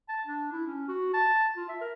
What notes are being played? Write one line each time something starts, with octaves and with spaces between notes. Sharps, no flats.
A5
D4
E4
C#4
F#4
A5
F4
E5
A#4